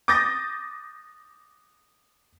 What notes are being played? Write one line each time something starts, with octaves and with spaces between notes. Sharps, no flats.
D6 D#6 G6 A6 A#6